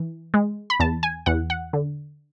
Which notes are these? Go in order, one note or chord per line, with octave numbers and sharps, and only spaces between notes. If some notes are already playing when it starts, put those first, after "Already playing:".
Already playing: E3
G#3
B5
E2 A5
G#5
E2 F#5
F#5
D3